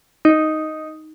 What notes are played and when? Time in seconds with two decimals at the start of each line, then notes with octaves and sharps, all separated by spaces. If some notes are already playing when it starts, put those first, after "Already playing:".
0.25 D#4